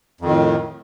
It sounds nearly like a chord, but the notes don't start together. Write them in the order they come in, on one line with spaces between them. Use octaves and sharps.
F2 D#3 A2